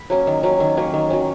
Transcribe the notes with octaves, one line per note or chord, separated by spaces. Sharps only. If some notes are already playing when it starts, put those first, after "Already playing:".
Already playing: B5
F#3 A#3 C#4
D#3
F#3 A#3 C#4
D#3
F#3 A#3 C#4
D#3
F#3 A#3 C#4